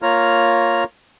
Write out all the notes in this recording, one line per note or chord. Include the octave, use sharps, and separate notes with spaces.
A#3 F4 C#5 A#5 F6